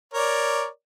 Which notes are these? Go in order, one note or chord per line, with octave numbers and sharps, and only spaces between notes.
A#4 C#5 D5